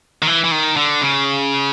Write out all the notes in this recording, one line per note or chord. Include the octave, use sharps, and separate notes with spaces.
D#3
E3
E3
D#3
D3
C#3